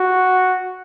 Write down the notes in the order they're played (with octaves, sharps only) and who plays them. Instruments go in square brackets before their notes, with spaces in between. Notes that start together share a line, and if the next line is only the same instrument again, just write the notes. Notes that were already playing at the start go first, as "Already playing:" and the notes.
Already playing: [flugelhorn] F#4